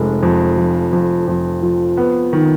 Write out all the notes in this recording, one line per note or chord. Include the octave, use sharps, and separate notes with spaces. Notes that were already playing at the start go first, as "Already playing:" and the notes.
Already playing: F1 F2 G#3
F2
F3
F2
F2
F3
B3
D#3